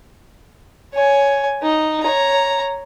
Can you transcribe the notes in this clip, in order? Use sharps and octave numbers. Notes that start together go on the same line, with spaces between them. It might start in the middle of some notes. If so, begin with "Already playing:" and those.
C#5 G#5
D#4
C#5 A#5